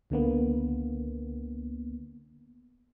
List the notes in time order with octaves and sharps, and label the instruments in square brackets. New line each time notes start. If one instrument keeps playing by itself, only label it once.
[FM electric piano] C#2 D3 A#3 B3